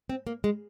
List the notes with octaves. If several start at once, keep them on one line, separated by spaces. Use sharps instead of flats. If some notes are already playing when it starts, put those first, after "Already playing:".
C4
A#3
G#3